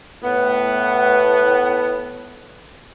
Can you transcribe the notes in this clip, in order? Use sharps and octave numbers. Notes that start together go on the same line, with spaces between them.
A2 B3